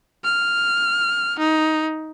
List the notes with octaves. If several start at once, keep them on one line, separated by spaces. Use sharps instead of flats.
F6
D#4